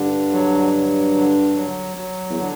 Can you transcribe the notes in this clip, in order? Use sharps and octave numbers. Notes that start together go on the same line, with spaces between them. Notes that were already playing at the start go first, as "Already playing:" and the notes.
Already playing: G2 D3
F#3
F#3
D3
F#3
F#3
E2
D3